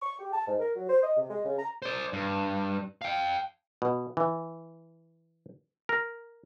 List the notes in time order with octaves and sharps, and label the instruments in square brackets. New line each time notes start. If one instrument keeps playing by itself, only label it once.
[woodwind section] C#6
G4
A5
G#2
A#4
F#3
C5
D#5
C3
G#3
C#3
A#5
[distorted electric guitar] C5 D5
G2
F5 G5
[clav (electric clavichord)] B2
E3
A#4